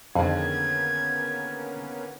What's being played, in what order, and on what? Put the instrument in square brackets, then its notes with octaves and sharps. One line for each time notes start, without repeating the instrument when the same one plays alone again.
[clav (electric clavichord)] F2 [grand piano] D3 D#3 G#4 [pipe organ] A#3 B3 C#4 [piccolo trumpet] G#6